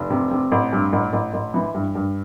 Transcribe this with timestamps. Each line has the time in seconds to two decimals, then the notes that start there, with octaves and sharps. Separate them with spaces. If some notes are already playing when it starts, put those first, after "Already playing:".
Already playing: F1
0.10 C3
0.31 C3
0.52 A1
0.73 G2
0.93 A1
1.13 A1
1.33 A1
1.54 E3
1.74 G2
1.95 G2